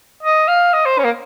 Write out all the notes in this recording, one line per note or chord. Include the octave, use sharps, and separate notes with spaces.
D#5
F5
D#5
C5
C#4
A#3